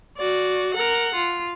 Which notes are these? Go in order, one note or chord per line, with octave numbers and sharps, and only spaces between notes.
F#4 D5
A#4 F#5
F4